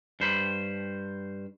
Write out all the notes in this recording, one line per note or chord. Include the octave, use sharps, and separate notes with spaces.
G2 C5 B5